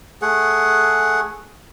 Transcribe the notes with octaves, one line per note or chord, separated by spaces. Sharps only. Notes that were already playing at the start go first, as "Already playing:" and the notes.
A3 G#4 F#5